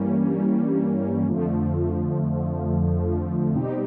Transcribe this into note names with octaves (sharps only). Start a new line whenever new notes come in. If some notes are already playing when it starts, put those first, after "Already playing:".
Already playing: G2 E3 G3 A#3 C#4
F2 D3 F3 A3
B2 G3 C4 D#4 G4